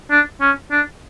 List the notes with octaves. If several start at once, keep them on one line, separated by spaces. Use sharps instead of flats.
D4
C#4
D4